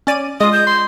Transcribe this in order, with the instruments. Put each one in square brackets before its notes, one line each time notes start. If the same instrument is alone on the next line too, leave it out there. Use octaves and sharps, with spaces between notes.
[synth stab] C#4 D5 D#7
[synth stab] G#3 F4 [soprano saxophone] D#5 [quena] D#6
[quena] G6
[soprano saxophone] C6